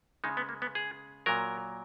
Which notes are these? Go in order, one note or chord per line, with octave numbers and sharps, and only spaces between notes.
C#3 G#3 D#4
B3
A#3
B3
G#4
A#2 F#3 A#4